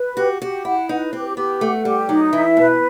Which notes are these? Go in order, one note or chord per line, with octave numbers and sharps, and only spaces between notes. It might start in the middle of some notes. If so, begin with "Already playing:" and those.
Already playing: B4
F#4 G4
F#4 G4
E4 F#5
D#4 B4
C4 G4
B3 G4
A3 F#5
G3 G4
F#3 D#4
E3 E5
B2 B4